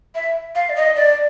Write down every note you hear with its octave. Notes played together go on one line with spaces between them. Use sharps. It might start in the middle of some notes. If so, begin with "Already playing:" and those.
E5
F5
D5
D#5
D5